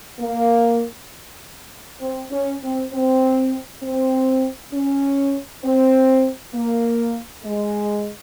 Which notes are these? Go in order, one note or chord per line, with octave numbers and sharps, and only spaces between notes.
A#3
C4
C#4
C4
C4
C4
C#4
C4
A#3
G#3